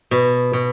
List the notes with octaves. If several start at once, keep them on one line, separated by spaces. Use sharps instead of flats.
B2
B2